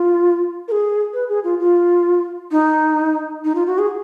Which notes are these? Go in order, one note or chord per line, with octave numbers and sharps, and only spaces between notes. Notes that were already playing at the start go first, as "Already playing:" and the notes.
Already playing: F4
A#4
G#4
B4
G#4
F4
F4
D#4
D#4
F4
F#4
G#4